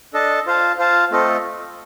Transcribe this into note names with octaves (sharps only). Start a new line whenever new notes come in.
D4 A4 D#5 A5
F4 C5 F5 A5
F4 C5 F5 A5
A3 C4 F4 A4 D#5